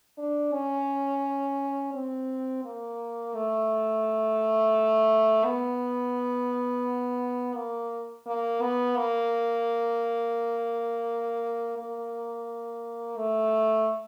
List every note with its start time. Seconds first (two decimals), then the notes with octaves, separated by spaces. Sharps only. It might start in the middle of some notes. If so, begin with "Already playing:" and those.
0.18 D4
0.53 C#4
1.94 C4
2.65 A#3
3.35 A3
5.45 B3
7.56 A#3
8.26 A#3
8.62 B3
8.97 A#3
11.78 A#3
13.18 A3